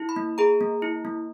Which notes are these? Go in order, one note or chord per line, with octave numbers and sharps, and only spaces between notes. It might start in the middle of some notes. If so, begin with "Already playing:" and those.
Already playing: E4
B5
A#3
G#4 A#5
A#3
E4
A#3